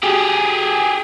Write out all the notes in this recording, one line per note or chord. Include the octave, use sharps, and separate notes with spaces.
G4 G#4